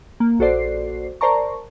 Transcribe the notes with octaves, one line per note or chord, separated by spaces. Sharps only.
A#3
A#1 F#4 A4 C5 D5 C7
A#4 C5 D5 A5 A#5 C#6